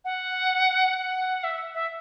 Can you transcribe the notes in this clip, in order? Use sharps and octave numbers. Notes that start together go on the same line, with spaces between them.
F#5
F#5
E5
E5